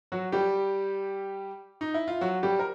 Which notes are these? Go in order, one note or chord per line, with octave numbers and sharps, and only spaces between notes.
F#3 F#4
G3 G4
D#4
E4
F4
F#3 F#4
G3 G4
A#4